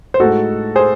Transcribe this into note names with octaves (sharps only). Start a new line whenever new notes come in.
C5
A2 G#3 D#4 F#4 A4
G#4 C5